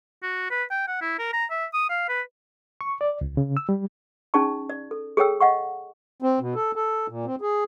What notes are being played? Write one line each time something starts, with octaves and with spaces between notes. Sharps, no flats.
F#4
B4
G5
F#5
E4
A#4
A#5
E5
D#6
F5
B4
C#6
D5
C#2
C#3
E6
G3
C#4 D#4 G#4 D5 A5 C#6
D5
A4
G#4 A4 C#5 G5 E6
D#5 F5 F#5 C#6
C4
B2
A4
A4
A#2
C4
G#4